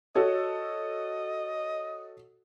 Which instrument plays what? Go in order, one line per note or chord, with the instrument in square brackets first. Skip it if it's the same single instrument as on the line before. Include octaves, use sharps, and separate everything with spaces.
[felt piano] F#4 A4 C#5 [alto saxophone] D#5